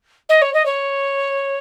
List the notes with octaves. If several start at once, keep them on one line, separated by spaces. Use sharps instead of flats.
D#5
C#5
D#5
C#5